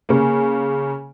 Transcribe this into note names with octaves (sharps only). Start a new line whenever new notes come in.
C#3 A#3